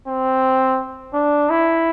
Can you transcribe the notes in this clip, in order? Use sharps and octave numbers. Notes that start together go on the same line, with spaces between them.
C4
D4
E4